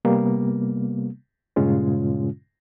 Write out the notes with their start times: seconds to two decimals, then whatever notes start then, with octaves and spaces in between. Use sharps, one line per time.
0.05 C3 G3 A#3 B3
1.56 G2 A#2 C#3 G#3 C#4 F4